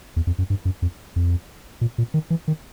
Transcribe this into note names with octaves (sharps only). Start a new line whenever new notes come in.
E2
F2
F#2
G2
F#2
F2
F2
A#2
A#2
D#3
E3
D#3